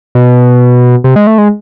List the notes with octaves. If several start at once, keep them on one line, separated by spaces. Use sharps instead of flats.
B2
C3
G#3
A3
G#3